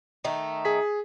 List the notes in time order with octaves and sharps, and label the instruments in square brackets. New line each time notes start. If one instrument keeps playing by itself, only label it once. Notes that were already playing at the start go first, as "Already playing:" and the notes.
[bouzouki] D#3 A3 D#4
[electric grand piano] G#4 B6